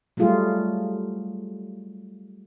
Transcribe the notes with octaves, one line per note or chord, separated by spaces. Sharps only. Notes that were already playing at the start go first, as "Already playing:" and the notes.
F#3 G3 A3 F4 G#4